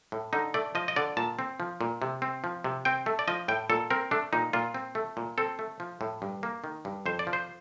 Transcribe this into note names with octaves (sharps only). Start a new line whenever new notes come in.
A2
D3 D#4
A3 D5
F3 D#5
D#5
D3 D5
A#2 A5
C4
F3
A#2
C3
C4
F3
C3
C4 G5
A3
D5
F3 D#5
A2 G5
A#2 A4
C4 A#4
A3 D4
A#2 D#4
A#2 F4
C4
A3
A#2
C4 A4
A3
F3
A2
G2
A#3
D#3
G2
F2 C5
D5
F3
C5